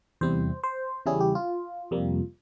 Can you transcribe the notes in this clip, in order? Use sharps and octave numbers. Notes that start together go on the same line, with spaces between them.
E2 C3 G3 C4 E4 C5
C5
E2 C#3 G3 C#4 E4 G#4
G4
F4
F2 C3 G3 A#3